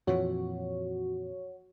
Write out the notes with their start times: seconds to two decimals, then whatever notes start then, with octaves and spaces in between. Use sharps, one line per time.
0.07 F2 A#2 E3 F#4 C#5